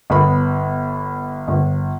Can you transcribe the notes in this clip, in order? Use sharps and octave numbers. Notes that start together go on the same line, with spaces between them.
G1 B3 B5
G1